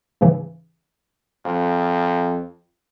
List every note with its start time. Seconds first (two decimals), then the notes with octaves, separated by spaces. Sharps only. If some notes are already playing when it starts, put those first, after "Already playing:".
0.21 G#2 C#3 E3
1.45 F2